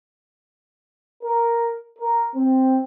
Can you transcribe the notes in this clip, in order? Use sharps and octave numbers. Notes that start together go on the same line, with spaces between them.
A#4
A#4
C4